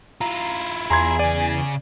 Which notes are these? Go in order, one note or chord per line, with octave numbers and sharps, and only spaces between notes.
E4 F4 A#5
E2 G#4 A#5 C6 G#6
C#3 D5 G#5